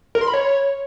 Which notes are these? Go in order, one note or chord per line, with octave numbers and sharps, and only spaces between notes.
A#4
C6
B5
C#5